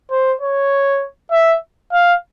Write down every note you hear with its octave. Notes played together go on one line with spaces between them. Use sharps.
C5
C#5
E5
F5